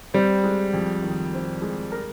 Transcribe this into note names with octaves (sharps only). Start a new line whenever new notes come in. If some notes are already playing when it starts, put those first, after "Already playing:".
G3 C4
G#3
F2
D#3
C4
G#3
A#4